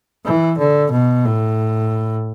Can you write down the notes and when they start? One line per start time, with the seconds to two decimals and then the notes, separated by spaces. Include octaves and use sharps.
0.25 E3
0.58 D3
0.91 B2
1.25 A2